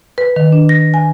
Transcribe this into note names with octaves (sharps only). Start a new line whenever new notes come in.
B4
D#3
D4
A#6
G#5